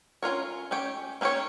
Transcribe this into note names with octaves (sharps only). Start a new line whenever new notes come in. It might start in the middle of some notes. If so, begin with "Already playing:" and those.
C#4 F4 A#4 C#5
C#4 G4 C#5
A#3 C#4 G4 C#5